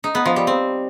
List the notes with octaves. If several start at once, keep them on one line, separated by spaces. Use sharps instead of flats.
D#4
B3
F3
G3
C4